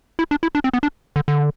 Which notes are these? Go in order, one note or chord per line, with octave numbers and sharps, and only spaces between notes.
E4
D4
E4
D4
C4
B3
D4
D3
D3